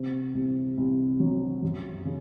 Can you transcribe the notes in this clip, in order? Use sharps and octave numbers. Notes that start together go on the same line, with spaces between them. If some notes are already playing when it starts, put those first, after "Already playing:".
Already playing: C3
C2
C2
F#3
F#2
C#3